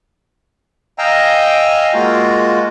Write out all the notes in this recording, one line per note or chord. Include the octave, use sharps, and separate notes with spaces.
D#5 F5 G5 G#5 A#5 E6
G#3 A#3 F4 F#4